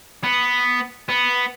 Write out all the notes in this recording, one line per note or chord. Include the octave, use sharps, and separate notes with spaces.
B3
B3